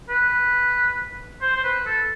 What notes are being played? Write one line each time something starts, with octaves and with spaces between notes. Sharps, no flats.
B4
C5
C5
B4
A4